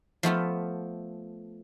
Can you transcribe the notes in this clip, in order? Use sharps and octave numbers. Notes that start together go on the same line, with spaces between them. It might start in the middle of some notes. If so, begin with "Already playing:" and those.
F3 A3 B3 F4